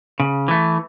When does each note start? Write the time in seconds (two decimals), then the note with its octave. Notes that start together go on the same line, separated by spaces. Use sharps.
0.20 C#3
0.48 E3 A3